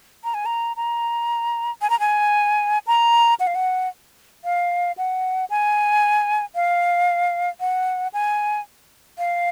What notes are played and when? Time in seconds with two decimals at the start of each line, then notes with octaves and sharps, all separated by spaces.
0.24 A#5
0.34 G#5
0.46 A#5
0.76 A#5
1.81 G#5
1.90 A#5
2.00 G#5
2.87 A#5
3.40 F#5
3.47 F5
3.55 F#5
4.45 F5
4.98 F#5
5.50 G#5
6.55 F5
7.60 F#5
8.13 G#5
9.18 F5